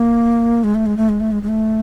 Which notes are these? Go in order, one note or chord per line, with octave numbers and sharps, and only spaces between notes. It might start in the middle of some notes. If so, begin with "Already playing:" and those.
Already playing: A#3
G#3
A3
G#3
A3
G#3
A3
G#3
G#3
A3